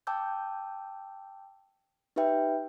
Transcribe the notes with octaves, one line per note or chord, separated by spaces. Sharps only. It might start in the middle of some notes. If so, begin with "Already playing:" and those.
G5 A5 D6 E6 G6
D#4 G4 B4 E5 G5